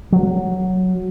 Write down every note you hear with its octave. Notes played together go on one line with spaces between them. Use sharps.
F#3